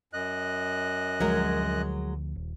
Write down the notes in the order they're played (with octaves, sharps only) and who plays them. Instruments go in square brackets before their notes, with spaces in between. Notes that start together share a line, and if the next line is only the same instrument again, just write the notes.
[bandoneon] F#2 D#5 F#6
[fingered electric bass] D2 F3 [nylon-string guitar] F#3 G#3 A#4
[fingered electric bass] D#1